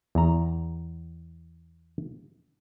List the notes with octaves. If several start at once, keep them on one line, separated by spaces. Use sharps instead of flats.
E2 A#5